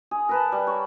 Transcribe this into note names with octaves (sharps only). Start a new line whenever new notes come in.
G#4
A#4 B4 A5
G3
C#5